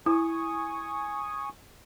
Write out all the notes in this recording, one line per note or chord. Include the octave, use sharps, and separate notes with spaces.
E4 G#5 C#6 D#6